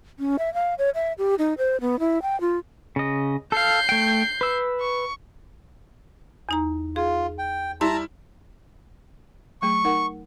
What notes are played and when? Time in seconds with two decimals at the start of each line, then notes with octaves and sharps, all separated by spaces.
0.19 C#4
0.39 E5
0.54 F5
0.78 C#5
0.95 E5
1.18 G4
1.39 D#4
1.58 C5
1.81 B3
2.00 E4
2.22 G5
2.41 F4
2.96 C#3 D#5
3.52 A4 F5 G6 C7
3.89 A3 G5
4.41 B4 E6
4.81 C#6
6.49 E2 D#4 A#5
6.96 F4 G#4
7.38 G5
7.81 G3 E4 A5 A#5 C6
9.62 F#3 A3 G#4 C#6
9.84 D#4 A#4 F#5